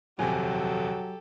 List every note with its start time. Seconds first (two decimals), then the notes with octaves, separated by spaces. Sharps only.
0.19 D#1 F2 C3 F#3 G4 A4 G#5